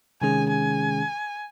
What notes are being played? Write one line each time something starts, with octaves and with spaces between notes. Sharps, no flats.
C3 D#3 G#3 C#4 G#4 G#5
G#5